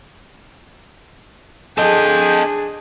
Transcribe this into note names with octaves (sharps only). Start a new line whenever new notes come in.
D4 G#4 A4 D#5 G5